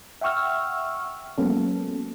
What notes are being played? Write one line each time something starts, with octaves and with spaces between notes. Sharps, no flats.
E5 F#5 G5 C#6 E6 F6
F#3 G#3 A#3 B3 C#4 A4